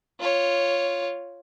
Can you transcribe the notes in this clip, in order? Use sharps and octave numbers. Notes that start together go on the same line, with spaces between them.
F4 C#5